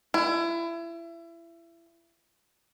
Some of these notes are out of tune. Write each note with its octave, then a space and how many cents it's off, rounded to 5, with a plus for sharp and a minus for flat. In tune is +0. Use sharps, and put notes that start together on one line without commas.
E4 +30